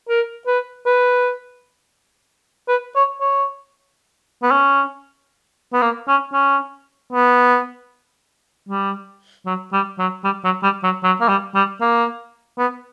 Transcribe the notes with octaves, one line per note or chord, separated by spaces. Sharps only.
A#4
B4
B4
B4
C#5
C#5
B3
C#4
B3
A#3
C#4
C#4
B3
G3
F#3
G3
F#3
G3
F#3
G3
F#3
F#3
A#3
G3
G3
A#3
B3